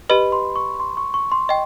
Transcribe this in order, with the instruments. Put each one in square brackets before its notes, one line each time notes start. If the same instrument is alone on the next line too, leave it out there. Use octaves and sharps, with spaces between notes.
[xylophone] G4 B4 D#5 [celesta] B5
[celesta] C6
C#6
C6
C#6
C#6
C6
[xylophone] D#5 G5